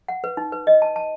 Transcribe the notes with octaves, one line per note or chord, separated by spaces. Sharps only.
F#5
B4
D#4
B4
D#5
A5
A5